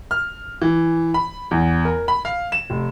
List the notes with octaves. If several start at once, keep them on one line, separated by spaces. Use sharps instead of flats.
F6
E3
B5
E2
A#4
B5
F5
E7
F1